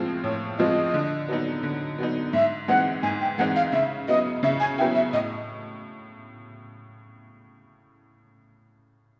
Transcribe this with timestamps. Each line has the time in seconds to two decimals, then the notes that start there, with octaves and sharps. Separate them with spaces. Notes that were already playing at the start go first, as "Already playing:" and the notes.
Already playing: A2 F3 G#3 C4 F4
0.24 A2 C#5
0.58 F3 G#3 C4 F4 D#5
0.94 D3
1.28 F#3 B3 D#4
1.63 D3
1.98 F#3 B3 D#4
2.33 G#2 E5
2.68 E3 G#3 C4 D#4 F#5
3.03 G#2 G#5
3.21 G5
3.38 E3 G#3 C4 D#4 F#5
3.56 F5
3.73 C#3 E5
4.08 F#3 B3 E4 D#5
4.43 C#3 E5
4.60 G#5
4.78 F#3 B3 E4 G5
4.95 E5
5.13 A2 D#5